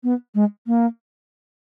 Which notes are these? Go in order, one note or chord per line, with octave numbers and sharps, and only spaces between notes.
B3
G#3
A#3